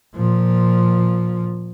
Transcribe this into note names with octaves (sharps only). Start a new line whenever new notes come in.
A#2 F3